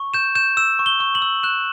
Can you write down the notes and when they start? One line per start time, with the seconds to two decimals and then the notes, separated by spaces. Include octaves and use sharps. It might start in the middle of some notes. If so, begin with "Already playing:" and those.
Already playing: C#6
0.14 G6 E7
0.35 G6 E7
0.57 E6 E7
0.79 C#6
0.86 G7
1.00 C#6
1.15 F#7
1.22 E6
1.43 F#6 E7